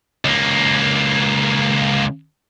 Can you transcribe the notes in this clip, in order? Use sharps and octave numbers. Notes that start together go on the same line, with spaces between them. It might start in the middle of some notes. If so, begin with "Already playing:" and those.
C#2 A#3